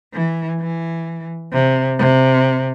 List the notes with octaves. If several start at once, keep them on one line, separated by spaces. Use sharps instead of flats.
E3
E3
C3
C3